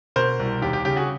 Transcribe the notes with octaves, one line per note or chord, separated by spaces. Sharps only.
B2 A#4 C5
C2
D#2 G4
G4
C#3 G4
F#4 G#4